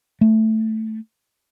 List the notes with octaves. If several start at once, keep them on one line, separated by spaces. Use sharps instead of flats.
A3